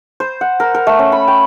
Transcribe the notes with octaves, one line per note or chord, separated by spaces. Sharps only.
C5
F#5
A#4
A#4
A3
C#4
B5
G5